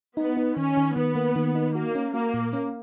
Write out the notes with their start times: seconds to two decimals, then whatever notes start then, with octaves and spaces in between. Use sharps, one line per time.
0.17 B3 D#4
0.37 D#4
0.57 D#3 C#4
0.77 D#3
0.96 D#3 B3
1.15 A#3
1.36 D#3
1.55 D#4
1.75 A#3 F#4
1.95 C#4
2.14 A#3 F#4
2.34 A#2
2.53 C#4